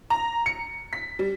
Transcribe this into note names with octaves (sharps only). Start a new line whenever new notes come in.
A#5
C#7
B6
G3